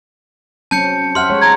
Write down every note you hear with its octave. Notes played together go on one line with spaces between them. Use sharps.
F#3 C4 C#4 A5 G6 C#7
G4 E5 F#5 C6 F6
G#3 C#5
A#5 G#6